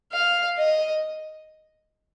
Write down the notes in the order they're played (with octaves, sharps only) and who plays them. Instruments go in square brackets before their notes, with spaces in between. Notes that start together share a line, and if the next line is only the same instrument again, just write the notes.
[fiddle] F5
D#5